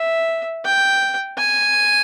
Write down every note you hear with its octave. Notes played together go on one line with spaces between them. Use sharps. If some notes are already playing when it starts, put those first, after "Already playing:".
Already playing: E5
G5
G#5